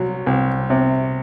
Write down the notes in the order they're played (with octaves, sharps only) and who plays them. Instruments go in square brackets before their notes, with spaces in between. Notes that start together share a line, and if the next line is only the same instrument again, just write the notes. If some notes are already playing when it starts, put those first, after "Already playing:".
Already playing: [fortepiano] C2 F#3
C2
C3